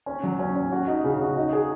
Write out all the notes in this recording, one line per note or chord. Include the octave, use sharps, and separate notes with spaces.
C#4
F#3
C#4
C#4
F#4
D#4
C#3
F#4
D#4
G#4